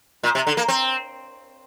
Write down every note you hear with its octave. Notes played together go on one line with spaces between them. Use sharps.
A#2
C3
D3
A#3
C4